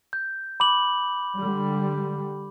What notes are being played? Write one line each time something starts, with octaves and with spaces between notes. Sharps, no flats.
G6
B5 D6 F#7
D3 G3